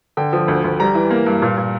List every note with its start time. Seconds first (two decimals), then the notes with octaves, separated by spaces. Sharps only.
0.17 D3 G5
0.33 F3
0.48 D2
0.64 D2
0.80 G3 A#5
0.95 E3
1.10 A#3
1.26 G2
1.42 A#2
1.57 A#2